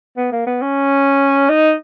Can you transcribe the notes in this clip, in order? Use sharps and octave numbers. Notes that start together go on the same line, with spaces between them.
B3
A#3
B3
C#4
D#4